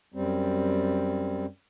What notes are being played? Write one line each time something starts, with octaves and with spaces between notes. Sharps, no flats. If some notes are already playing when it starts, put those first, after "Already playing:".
F#2 G3 C4